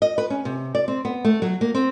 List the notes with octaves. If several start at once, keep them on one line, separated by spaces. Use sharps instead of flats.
D#5
B4
C#4
C3
D5
C4
B3
A3
F#3
A#3
C4